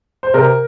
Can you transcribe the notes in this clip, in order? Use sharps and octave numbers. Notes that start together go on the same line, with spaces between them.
C5
C3 A#4